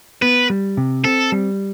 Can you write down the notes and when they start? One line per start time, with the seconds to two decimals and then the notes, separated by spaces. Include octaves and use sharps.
0.22 B3 B4
0.50 G3
0.77 C3
1.04 C4 A4
1.32 G3